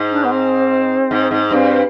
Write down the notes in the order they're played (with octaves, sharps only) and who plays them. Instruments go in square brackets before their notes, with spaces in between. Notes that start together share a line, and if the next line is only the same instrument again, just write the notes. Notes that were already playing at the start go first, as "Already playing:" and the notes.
Already playing: [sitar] G#2
[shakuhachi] D4
B3
C4
[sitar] G#2
G#2
[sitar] G2 [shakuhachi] C4